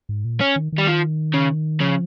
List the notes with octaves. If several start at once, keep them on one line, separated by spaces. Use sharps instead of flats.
G#2
A#2
C#4
D#3
D#3
G3
F3
C#3
C#3 F3